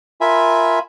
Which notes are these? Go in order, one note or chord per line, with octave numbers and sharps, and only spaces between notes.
F4 A#4 E5 G#5 B5